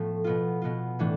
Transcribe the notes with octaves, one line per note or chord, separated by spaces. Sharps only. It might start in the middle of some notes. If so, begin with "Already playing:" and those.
Already playing: A2 F3 A3 B3
B2 B3 F4
B2 B3 F4
A2 E3 A3 D4